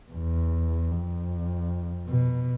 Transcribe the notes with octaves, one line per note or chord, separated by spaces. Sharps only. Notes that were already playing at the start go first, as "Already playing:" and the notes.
E2
F2
B2